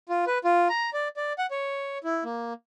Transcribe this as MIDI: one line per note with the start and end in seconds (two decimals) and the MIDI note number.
0.09 0.25 65
0.27 0.38 71
0.45 0.68 65
0.69 0.90 82
0.93 1.08 74
1.17 1.33 74
1.39 1.46 78
1.51 1.98 73
2.04 2.24 64
2.24 2.53 58